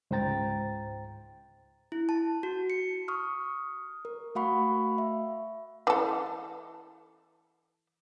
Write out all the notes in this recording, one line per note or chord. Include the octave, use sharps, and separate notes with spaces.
C#2 G#2 C5 G5 A#5 A6
E4
A5
F#4
C#7
C#6 D#6 F6
A#4
A3 F#4 F5 F#5 B5 C#6
E5
E3 A4